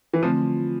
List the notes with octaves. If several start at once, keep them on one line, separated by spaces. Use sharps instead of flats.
E3
D3 F3 A3 C4 F4